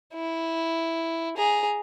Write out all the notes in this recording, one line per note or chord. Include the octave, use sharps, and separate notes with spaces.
E4
G#4 A#5